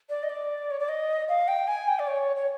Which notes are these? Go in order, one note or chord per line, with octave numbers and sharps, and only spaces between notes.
D5
D#5
D5
C#5
D5
D#5
F5
G5
G#5
G5
D5
C#5
C#5